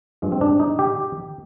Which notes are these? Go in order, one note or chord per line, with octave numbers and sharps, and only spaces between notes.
G2 F3 G#3
C4
D4
D#4
G4